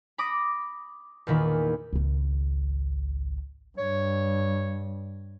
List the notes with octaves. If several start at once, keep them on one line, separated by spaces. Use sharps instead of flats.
B5 D6 D#6 A#6
E2 A#2 D#3 B5
G#1 C#2
G2 C#5